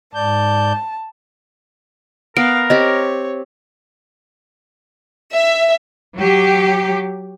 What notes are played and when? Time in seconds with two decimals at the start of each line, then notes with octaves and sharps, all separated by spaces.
0.15 G#2 D5 A5 G6
2.37 B3 A#4 F5 D7
2.70 C4 G4 C#5 D#5
5.34 E5
6.18 F#3 G4